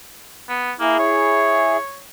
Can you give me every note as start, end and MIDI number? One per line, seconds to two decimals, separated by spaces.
0.49 0.72 59
0.80 0.94 58
0.80 1.77 64
0.80 1.77 68
0.99 2.02 73